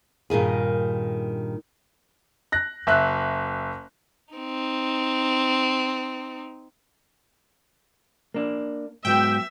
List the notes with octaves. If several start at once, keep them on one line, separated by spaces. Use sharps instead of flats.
G2 A#2 D#3 G#4
F#6 A#6
F#1 E5 F#6
C4 D#4
A#3 D4
G#2 F#3 B3 E5 G5